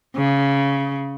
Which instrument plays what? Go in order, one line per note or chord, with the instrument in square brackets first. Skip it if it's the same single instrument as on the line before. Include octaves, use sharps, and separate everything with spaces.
[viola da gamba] C#3